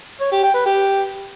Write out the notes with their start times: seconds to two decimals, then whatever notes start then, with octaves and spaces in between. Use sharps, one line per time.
0.21 C#5
0.32 G4
0.43 G5
0.55 B4
0.66 G4